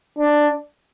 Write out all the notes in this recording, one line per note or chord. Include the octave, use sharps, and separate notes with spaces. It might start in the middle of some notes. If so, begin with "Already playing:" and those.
D4